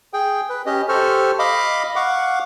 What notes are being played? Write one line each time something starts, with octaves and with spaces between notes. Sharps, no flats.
G#4 G5
B4
C#4 G4 D#5
G4 A4 C5 C#6 F6
D#5 F5 B5 D6
F5 F#5 C#6 D6